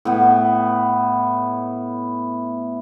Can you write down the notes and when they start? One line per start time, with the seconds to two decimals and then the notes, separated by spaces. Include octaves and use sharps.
0.05 A2 B3